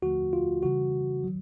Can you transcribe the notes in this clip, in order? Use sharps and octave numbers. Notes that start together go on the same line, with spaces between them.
D#2 D3 F3 A3 F#4
F4
C#3 E3 G3 F#4
D#3 F#3